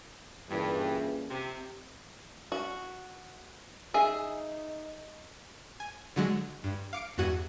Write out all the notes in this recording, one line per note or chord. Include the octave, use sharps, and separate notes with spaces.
G2 A#2 C#3 E3
C3
F#4
D#4 G#4 E5
G#5
D3 F#3 G#3
G2
F5 D6 C#7 D7
E2 G2 F#4 F#5 G#6 D#7